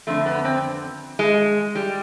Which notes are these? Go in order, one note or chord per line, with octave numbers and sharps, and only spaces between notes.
F2 D3 A3
B3
C4
G#3
G3